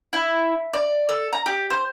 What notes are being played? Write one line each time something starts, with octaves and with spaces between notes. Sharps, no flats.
E4
D5
A4
A#5
G4
C5